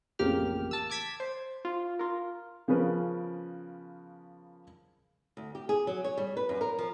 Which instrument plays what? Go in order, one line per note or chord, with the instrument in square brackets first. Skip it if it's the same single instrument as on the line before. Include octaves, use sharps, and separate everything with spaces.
[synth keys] A1 F2 C#3 A#3 G4 F6
A5 E6
A5 D6 G#6 B6
C5
F4
F4 A#4
[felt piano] C#3 F3 B3 C#4 A#4 B4
[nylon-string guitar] D2
G4
G#4
F#3
C#5
G3
B4
F#2
A#4
F3